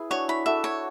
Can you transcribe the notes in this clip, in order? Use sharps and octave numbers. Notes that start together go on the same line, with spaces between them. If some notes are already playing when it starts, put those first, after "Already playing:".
Already playing: E4 G#4 B4
D4 F#4 C#5
E4 B5
F#4 A4 E5
C#5